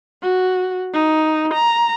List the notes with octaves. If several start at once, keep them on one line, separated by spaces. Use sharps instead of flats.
F#4
D#4
A#5